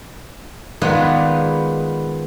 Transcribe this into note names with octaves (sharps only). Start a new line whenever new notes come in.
D#3 G#3 B3 F4 B4 D5